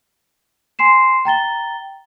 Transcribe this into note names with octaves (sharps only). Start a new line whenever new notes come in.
G#5 C6 C7 E7
G5 A#5 A6 G7